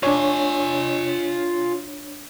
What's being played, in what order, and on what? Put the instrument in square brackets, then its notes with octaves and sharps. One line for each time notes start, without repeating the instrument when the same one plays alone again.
[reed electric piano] D4 C#5 [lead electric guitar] F4 G#5